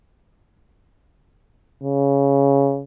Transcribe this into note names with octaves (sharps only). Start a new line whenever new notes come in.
C#3